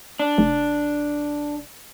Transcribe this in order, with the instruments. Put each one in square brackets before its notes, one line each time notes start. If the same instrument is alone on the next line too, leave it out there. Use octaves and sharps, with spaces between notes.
[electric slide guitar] D4
[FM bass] F1